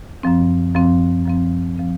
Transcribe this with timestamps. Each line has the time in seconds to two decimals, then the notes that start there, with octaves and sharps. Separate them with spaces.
0.23 F#2 F3 C4
0.75 F#2 F3 C4
1.26 F#2 F3 C4
1.78 F3 C4